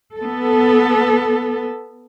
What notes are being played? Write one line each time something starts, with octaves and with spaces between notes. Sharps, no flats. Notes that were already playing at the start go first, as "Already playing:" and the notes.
B3 A4